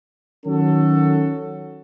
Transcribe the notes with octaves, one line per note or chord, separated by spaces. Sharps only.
D#3 F#3 C#4 F#4 A4